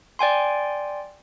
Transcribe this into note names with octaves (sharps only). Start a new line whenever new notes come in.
D5 G5 G#5 C6